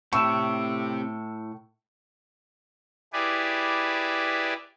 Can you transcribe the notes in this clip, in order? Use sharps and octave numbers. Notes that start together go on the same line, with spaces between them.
A2 C4 G4 A5 C#6 E6 E7
E4 G4 G#4 B4 D5